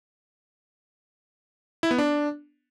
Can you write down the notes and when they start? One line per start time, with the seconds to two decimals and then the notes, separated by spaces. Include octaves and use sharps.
1.83 E4
1.91 B3
1.98 D4